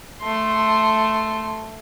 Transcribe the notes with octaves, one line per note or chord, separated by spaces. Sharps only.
A3 C6